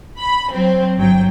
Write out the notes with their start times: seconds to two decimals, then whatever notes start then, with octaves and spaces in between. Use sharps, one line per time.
0.19 B5
0.50 F#3 C4
0.97 G1 F#3 G5